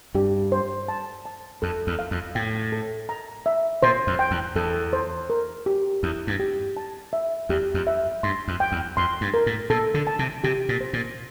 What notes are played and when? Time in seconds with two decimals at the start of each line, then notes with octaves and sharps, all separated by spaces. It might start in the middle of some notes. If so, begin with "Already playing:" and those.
0.15 G2 G4
0.52 C5
0.88 A5
1.26 A5
1.62 F2 A4
1.87 E2
1.99 F5
2.11 F2
2.35 A2 G5
2.72 A4
3.09 A#5
3.46 E5
3.83 A#2 C5
4.07 F2
4.19 G5
4.31 E2
4.55 E2 A4
4.93 C5
5.30 A#4
5.66 G4
6.03 E2 E4
6.27 G2
6.40 G4
6.77 A5
7.13 E5
7.49 E2 G4
7.74 F2
7.87 E5
8.23 G2 C6
8.48 F2
8.60 G5
8.72 E2
8.97 F2 C6
9.21 G2
9.34 A#4
9.46 A2
9.70 A#2 A4
9.94 D3
10.07 A5
10.19 C3
10.44 C3 G4
10.69 A#2
10.81 C5
10.93 A#2